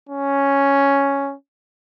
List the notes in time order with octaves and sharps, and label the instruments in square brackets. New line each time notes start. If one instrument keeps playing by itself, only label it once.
[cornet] C#4